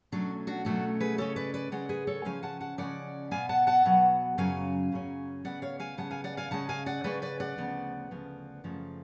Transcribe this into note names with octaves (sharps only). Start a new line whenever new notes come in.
B2 F#3 A3 C#4 D4
D4 F#4
B2 F#3 A3 C#4 D4 F#4
G#4 B4
C#3 G#3 C#4 A4 C#5
B4 D5
B4 D5
C#3 G#3 C#4 D5 F#5
G#4 B4
A4 C#5
C#3 F3 G#3 C#4 F5 G#5
F#5 A5
F#5 A5
C#3 F3 G#3 C#4 D5 F#5
B2 F#3 B3 F5 G#5
F#5 A5
F#5 A5
B2 F#3 B3
F#2 C#3 F#3 C#4 F5 G#5
F#2 C#3 F#3 C#4
C#3 G#3 B3 D5 F#5
C#5 F5
F5 G#5
C#3 G#3 B3 F#5 A5
F5 G#5
D5 F#5
F5 G#5
C#3 G#3 C#4 F#5 A5
F5 G#5
D5 F#5
C#3 G#3 C#4 B4 D5
B4 D5
D5 F#5
D2 C#3 F3 B3
D2 C#3 F3 B3
F#2 C#3 F3 A3